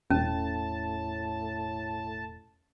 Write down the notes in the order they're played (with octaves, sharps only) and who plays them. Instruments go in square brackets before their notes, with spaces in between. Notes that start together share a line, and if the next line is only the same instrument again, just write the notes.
[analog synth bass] E1 [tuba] A2 [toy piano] C#4 [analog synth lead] A5